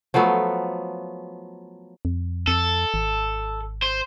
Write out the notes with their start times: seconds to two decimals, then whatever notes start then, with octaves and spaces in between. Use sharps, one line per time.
0.14 F3 F#3 A3 B3
2.05 F2
2.47 F2 A4
2.94 G#1
3.82 C5